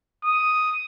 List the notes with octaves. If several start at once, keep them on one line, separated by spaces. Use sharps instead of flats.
D#6